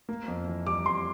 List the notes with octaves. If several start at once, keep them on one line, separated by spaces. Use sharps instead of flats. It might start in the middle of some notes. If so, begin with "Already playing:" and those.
A#3
F2
E3
G3 D6
F2 C6